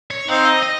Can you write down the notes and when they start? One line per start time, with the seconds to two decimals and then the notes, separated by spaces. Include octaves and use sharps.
0.11 C#5
0.28 C4 D#4 F5
0.45 D#5
0.63 D#5